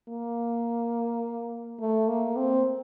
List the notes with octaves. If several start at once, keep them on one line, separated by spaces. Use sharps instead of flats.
A#3
A3
A#3
C4